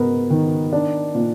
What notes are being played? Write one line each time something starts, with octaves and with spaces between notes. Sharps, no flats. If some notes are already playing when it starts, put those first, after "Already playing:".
Already playing: G#2 B3 A#4
D#3
D4
A#2